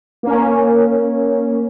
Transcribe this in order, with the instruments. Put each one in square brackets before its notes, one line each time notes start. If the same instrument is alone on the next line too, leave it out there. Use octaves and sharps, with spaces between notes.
[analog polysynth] A#3 C#4